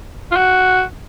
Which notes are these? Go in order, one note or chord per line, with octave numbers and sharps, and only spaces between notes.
F4
F#4